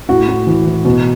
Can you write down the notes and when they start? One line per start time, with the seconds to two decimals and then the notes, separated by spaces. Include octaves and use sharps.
0.09 A2 F#4
0.28 A2
0.47 E3
0.66 E3
0.85 B2